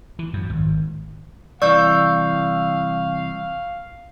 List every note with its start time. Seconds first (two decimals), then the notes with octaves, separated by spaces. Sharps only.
0.19 E3
0.33 F#2
0.50 G#1
1.62 C2 E3 D5 F5 C#6 E6 G6